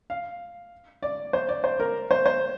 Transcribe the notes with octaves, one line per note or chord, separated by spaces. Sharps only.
F5
D5
C5
D5
C5
A#4
C5
C5